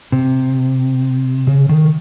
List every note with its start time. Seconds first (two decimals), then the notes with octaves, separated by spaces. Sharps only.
0.12 C3
1.47 C#3
1.69 D#3